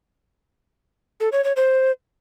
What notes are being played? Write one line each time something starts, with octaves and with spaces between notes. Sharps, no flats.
A4
C#5
C#5
C5